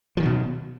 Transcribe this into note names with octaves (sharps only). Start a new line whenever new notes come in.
B2 D#3 F3 F#3